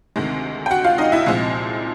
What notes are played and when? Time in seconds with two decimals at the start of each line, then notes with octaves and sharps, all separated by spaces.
0.16 D2 C3 D#3 G#3
0.66 G5
0.71 F#4 F#5
0.84 F4 F5
0.98 D#4 D#5
1.12 E4 E5
1.26 C2 A#2 F3 G#3 C4